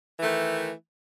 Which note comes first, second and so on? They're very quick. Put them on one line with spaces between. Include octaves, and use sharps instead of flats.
E3 A3 D#3